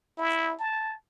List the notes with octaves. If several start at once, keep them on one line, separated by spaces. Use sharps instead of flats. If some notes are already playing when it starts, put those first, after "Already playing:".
E4
A5